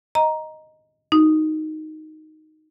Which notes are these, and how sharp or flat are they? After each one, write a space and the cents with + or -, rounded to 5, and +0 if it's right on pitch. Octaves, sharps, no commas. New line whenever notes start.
D#5 +0 A#5 +10
D#4 +0 F#4 +5